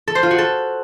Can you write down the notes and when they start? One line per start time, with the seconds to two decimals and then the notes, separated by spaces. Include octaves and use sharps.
0.07 A4
0.15 C5
0.23 F4
0.31 F#4
0.38 A4